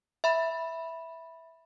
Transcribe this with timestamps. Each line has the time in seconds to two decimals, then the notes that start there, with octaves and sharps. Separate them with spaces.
0.24 E5 B5